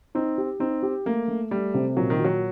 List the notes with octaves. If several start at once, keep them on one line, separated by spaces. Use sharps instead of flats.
C4 D#4
G4
C4 D#4
G4
A3 A#3
A3
G3 A3
C3
A#2 F#3
D#3
F#4
F#3